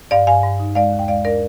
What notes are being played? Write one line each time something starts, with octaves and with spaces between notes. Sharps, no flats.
G2 D5 F5
G2 F5 G#5
G2
D#4
G#3 D5 F5
D#2
G5
G#3 D5 F5
D4 A#4 D5